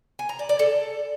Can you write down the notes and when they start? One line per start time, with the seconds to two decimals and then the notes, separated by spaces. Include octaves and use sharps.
0.19 G#5
0.29 A#5
0.39 D5
0.49 D5
0.59 A4